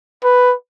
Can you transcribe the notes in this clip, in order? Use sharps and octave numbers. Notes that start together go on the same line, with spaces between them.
B4